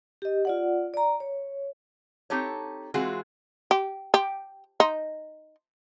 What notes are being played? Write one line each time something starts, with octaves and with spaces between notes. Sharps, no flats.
G4 D#5
F4 D5 F#5
D5 A#5
C#5
C4 D#4 G4 A4 C#5
E3 G#3 C4 F4 F#4 G#4
G4
G4
D#4